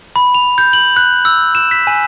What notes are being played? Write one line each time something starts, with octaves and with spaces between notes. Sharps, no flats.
B5
F7
G6
F#7
F#6
E6
E7
B6
G#5